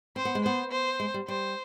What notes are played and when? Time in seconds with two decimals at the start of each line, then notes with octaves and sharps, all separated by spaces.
0.16 C4 C5
0.25 B3
0.35 G#3
0.44 B3 C5
0.72 C5
1.00 G#3
1.14 G3
1.28 G3 C5